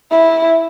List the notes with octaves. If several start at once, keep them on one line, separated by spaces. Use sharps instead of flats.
E4